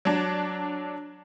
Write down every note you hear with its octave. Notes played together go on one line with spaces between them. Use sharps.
F#3 D4